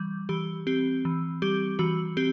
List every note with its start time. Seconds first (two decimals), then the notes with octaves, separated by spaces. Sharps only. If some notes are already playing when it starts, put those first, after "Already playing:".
Already playing: E3 G3
0.29 E3 G4
0.67 C4 G4
1.05 E3
1.42 G3 G4
1.79 E3 F#4
2.17 C4 G4